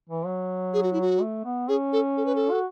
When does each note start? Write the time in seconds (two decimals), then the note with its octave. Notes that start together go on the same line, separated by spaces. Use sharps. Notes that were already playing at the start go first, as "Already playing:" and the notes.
0.09 E3
0.26 F#3
0.73 G#4
0.83 F#4
0.93 E4
1.01 F#4
1.21 A3
1.45 B3
1.68 C#4 G#4
1.93 A4
2.17 A4
2.26 B4
2.35 A4
2.51 F#4